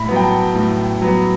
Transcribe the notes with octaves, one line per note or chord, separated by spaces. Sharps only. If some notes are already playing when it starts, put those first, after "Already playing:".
Already playing: A2 B5
F#3 B3
G5
A5
A2
F#3 B3